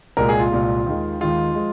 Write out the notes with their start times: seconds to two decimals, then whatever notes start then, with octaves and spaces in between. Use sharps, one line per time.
0.17 C2 A#2 G#3 A#4
0.29 G#4
0.40 F4
0.51 C2 A#2 G#3
0.86 D#2 D#3 G#3
1.20 D#2 D#3 G#3 F4
1.55 F3 G#3